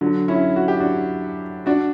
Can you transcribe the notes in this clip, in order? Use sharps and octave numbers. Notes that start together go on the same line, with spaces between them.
D3 F#3
C#4 E4
F#4
G4
D4 F#4
D4 F#4